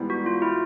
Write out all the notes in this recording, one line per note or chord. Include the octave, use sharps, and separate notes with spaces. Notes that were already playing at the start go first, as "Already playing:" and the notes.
Already playing: G#2 E3 G3 B3
F#4
F4
E4